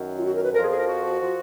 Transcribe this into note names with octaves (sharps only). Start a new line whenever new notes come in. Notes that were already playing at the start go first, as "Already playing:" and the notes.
Already playing: F#2 D#3 F#3
F4
F#4
A#4
B4
F2 F3 G#4 A#4
G#4
A#4
F#4
F3